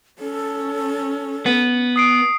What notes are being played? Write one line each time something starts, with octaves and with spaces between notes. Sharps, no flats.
C#4 A4
B3
D#6 C7 D7